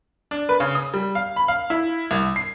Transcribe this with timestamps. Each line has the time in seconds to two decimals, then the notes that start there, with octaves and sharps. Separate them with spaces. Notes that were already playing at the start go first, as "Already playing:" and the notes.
0.31 D4
0.49 B4
0.60 C#3
0.75 D#6
0.94 G3
1.15 F5
1.36 B5
1.48 F5
1.70 E4
2.11 C2
2.36 C7